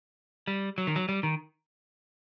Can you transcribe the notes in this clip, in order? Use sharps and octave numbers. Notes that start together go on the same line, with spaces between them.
G3
F#3
D#3
F#3
G3
D#3